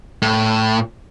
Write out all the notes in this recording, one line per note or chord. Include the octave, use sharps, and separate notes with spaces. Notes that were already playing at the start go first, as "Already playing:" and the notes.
A2